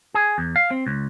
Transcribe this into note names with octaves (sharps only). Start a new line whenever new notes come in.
G#4
E2
F5
C4
C#2